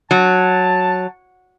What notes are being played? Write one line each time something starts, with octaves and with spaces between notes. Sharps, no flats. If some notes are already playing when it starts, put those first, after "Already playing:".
F#3 A5